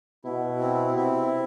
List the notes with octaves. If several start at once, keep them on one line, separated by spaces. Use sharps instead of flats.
B2 E4
C4
C3 E4